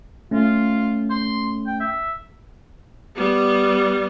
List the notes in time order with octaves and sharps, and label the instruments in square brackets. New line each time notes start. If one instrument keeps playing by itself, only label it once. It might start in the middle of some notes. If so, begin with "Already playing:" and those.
[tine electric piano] A3 C#4 [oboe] F4
[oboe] C6
G5
E5
[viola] G3 B3